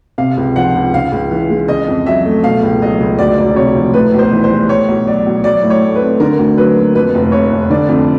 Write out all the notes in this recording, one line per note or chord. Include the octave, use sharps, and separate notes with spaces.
C3 F5
C#2
F3 F#5
C#2
C#3 F5
C#2
E3
G#3
C#3 D#5
F2
F#3 E5
A3
B2 F5
C#2
F#3 D#5
C#2
D2 D5
E1 D5
C3 C#5
F3
A2 B4
B1
C5
E3
C5
G3
A2 C#5
B1
F#3 D5
B1
F#3 D5
A2
C#5
A3
B4
C4
D3 A#4
D2
F#3 B4
A#3
F2 B4
F1
C3 C#5
F1
D3 D5
F2